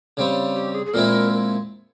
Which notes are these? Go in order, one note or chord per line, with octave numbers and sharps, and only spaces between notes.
C#3 G3 C4
G4
G#4
G#4
A#2 G#3 C4 E4 A#4